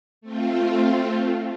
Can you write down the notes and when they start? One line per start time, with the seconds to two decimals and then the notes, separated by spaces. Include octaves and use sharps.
0.21 A3 C4 F4